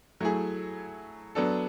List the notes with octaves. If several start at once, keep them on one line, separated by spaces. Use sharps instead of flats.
F#3 A3 E4 G#4
F#3 B3 D4 A4